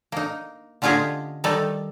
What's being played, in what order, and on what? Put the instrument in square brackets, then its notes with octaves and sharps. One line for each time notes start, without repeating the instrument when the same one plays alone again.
[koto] A#3 D#4
D3 C#4 F4 G4 G#4 D#5
D#3 G3 D#4 A4